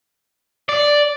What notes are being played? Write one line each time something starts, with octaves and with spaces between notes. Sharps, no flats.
D5